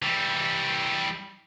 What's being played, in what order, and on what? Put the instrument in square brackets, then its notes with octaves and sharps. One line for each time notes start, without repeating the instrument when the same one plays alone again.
[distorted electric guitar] E3 G3